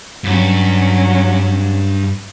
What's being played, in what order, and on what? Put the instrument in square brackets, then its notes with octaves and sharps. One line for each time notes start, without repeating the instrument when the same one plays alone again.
[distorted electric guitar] G2 [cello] F#3 C#4